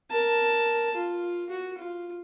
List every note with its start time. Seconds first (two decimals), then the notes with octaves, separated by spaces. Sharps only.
0.11 A#4 A5
0.96 F4
1.50 F#4
1.78 F4